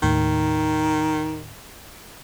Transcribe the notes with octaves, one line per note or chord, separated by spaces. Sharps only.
D#2 A2 D#3